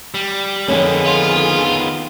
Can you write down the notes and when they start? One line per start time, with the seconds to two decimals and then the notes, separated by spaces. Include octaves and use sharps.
0.14 G3
0.68 F2 D3 D#3 B3 C#4 G#4
1.06 F4